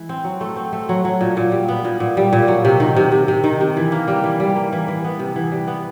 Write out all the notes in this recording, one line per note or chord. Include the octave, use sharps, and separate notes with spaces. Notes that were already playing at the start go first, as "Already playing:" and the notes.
Already playing: E3 G#3
C4
F#3
A3
C4
A3
F#3
F#3
A#2
A#2
G3
B3
A#2
A#2
G3
A#2
F#3
C3
D#3
C3
C3
C3
D#3
C3
E3
A#3
G3
E3
G3
A#3
E3
E3
B3
C3
E3
G3
B3